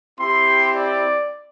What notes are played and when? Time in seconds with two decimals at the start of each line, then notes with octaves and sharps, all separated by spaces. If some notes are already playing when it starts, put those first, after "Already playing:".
0.18 C4 E4 G4 C6
0.73 D5